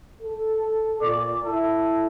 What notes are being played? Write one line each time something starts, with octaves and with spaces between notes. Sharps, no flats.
A4
A#2 D5
E4 A4